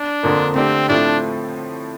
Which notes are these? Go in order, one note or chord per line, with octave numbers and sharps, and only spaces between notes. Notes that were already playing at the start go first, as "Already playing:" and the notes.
Already playing: D4
F2 D3 F3 A#3
D3 A3 C4 D4 G4
A2 F3 A3 C4 D4